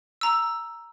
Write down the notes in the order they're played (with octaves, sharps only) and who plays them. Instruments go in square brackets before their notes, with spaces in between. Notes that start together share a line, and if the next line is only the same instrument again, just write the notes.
[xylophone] A#5 E6